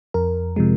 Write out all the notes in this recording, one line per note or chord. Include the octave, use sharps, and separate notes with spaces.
F2 A#4
C3 F3 G#3